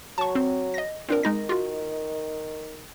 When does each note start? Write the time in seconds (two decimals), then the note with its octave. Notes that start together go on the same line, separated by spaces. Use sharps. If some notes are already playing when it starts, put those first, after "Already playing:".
0.18 F#3 A5 C#6
0.35 C4
0.74 D#5 A#6
1.09 A#2 C4 D4 A#4
1.23 D#3 G#3 D#4 A#6
1.49 F4 F#4